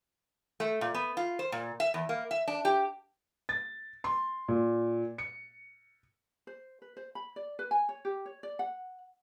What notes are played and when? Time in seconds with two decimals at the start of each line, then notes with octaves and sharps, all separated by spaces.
0.60 A3
0.81 A#2
0.94 B3
1.17 F4
1.39 C5
1.52 A#2
1.80 E5
1.94 E2
2.09 A#3
2.31 E5
2.48 D4
2.65 G4
3.49 A6
4.04 C6
4.48 A#2
5.18 C#7
6.47 C5
6.82 B4
6.97 C5
7.15 B5
7.36 D5
7.59 B4
7.71 G#5
7.89 C#5
8.05 G4
8.26 C#5
8.43 D5
8.59 F#5